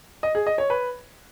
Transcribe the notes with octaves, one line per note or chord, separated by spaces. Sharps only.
D#5
G#4
D#5
C#5
B4